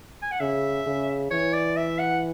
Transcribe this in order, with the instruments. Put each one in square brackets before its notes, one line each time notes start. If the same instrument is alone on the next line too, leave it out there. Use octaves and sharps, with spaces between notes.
[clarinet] G#5
F#5
[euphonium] C#3 [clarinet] E5
[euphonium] C#3
[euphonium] E3 [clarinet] C#5
[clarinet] D5
E5
F#5